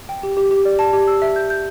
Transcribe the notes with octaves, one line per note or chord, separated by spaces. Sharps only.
G5
G4
G4
G4
D5
A5
G4
E6
E5
G6
G6